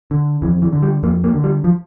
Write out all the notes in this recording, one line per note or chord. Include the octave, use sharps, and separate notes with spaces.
D3
F2 E3
E3
D3
G3
F2 A#3
A#3
D3
G3
F3